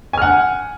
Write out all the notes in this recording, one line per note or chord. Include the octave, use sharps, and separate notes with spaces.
F#5 G#5 F6